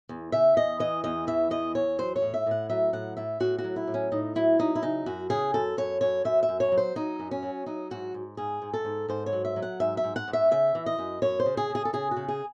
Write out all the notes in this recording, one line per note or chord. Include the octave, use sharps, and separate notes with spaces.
E2
C#3 E5
E2 D#5
E3 D#5
E2 D#5
E3 E5
E2 D#5
E2 C#5
F#3 C5
C#5
A2
E5
A2 F#5
F#3 E5
A2 F#5
A2 E5
A2 F#4
F#4
F#3
E4
A2
C#4
A2 D#4
F#3 E4
F#3 D#4
E4
C#3 D#4
F#2 F#4
C#3 G#4
F#2 A4
F#2 C#5
F#2 C#5
F#2 E5
E5
F#2
C#5
F#3
C5
F#3 D#4
F#2
C#4
F#3
F#3 D#4
G#2 F#4
G#2
G#2 G#4
G#2
A4
G#2
G#2 C5
C#5
F#3
E5
F#3
F#5
G#2 E5
E5
G#2
F#5
G#2
E5
C#3 E5
E3
D#5
F#2
F#2 C#5
C5
C#3
G#4
C#3
G#4
A4
C#3 G#4
F#4
C#3
G#4